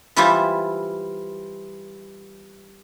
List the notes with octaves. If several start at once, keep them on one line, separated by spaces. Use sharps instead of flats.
E3 G3 E4 F4 C5